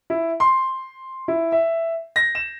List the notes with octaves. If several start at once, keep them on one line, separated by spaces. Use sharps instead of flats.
E4
C6
E4
E5
A#6
E7